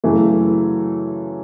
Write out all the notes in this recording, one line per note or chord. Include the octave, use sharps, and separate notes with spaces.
F#2 C#3 E3 A3